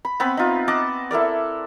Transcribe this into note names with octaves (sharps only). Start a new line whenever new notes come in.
B5
B3 C4 B4 B5
D#4 F4
D#5 F#5 A5 D6
E4 A4 A#4 D5